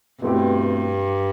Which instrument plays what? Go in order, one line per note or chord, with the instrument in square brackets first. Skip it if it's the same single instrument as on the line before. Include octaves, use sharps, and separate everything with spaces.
[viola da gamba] G2 [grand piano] B2 A3 C4 E4 G4